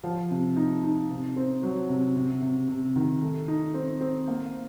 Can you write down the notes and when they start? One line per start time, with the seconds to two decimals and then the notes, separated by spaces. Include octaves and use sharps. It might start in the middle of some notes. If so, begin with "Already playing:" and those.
0.03 F3
0.31 C3
0.56 D#4
0.84 D#4
1.10 C3
1.36 C4
1.63 F#3
1.89 C3
2.16 C3
2.42 C3
2.68 C3
2.96 D#3
3.22 A3
3.48 D#4
3.74 C4
4.01 C4
4.28 A#3